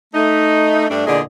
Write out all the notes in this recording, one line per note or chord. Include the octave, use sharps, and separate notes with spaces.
A3 D#4
G2 G3 A3 D4
E2 A#2 D3 G#4 D5 D#5